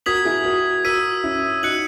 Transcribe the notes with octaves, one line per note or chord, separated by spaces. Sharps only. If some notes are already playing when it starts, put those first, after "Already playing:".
F#4 A#4 D#6 G#6 B6 F#7
E4 G#4
F#4 A#4
F#4 A#4 E6 B6 D#7
C#4 E4
D#4 F#4 F#6 C#7 F#7